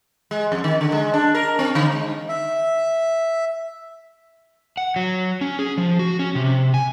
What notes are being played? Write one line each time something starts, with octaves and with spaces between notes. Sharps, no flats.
G#3
F2
D#3
D3
G#3
D4
A#4
C4
D3
G#3
E5
F#5
F#3
C#4
G#4
F3
F#4
C#4
C3
G#5